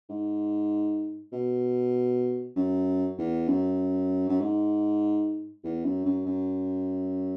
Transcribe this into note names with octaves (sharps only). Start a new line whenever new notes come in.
G#2
B2
F#2
E2
F#2
F#2
G#2
E2
F#2
F#2
F#2